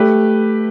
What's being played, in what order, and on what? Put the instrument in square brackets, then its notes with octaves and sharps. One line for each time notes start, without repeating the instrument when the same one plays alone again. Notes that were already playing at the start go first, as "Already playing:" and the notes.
Already playing: [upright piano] A3 G4 B4